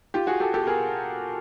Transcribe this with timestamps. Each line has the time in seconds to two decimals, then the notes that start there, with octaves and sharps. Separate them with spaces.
0.14 F4 G4
0.27 F#4 G#4
0.40 G4 A4
0.54 G4 A4
0.67 G#4 A#4